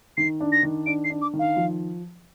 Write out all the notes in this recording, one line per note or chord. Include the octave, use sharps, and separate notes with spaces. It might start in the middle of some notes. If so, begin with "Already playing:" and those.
D#3 C7
D4
A#6
D#3
D4 D7
C7
D4
D6
D#3
F5
F3